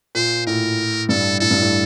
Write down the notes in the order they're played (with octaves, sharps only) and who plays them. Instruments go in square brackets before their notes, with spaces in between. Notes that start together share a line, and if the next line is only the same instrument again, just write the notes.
[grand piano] A#2 [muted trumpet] C5
[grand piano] A2 [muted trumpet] A#4
[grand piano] G2 [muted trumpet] A4
[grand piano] A2 [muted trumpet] A4
[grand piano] G2
A2